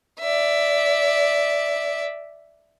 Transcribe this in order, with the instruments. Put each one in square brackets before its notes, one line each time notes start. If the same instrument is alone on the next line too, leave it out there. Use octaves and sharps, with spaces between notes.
[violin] D5 E5